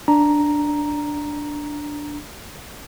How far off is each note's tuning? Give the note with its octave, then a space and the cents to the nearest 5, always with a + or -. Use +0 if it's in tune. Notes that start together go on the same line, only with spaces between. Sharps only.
D4 +0 A#5 +0